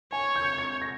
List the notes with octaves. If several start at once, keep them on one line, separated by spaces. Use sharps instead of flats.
C#5 G#5
G6
G#6
A#6